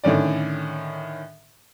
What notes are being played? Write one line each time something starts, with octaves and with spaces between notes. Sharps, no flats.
A2 D3 D#3 C#4 D5